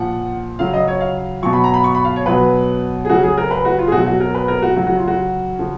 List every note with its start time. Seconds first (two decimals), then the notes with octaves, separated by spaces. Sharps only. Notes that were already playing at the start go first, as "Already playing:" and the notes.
Already playing: A#2 F3 F#5
0.59 C#3 F#3 F5
0.74 D#5
0.88 C#5
1.00 F5
1.42 B2 F#3 C#6
1.53 B5
1.64 A#5
1.74 B5
1.84 C#6
1.95 B5
2.05 F5
2.16 C#5
2.26 B2 F#3 B4
3.05 G#4
3.09 C#3 F#3 F#4
3.23 G#4
3.38 A#4
3.51 B4
3.65 F#4
3.79 F4
3.88 G#4
3.92 B2 F#3 F#4
4.06 F#4
4.20 A#4
4.35 B4
4.48 A#4
4.62 F#4
4.76 C#3 F#3 F#4
4.87 F#4
4.97 F4
5.07 F#4
5.59 C#3 F3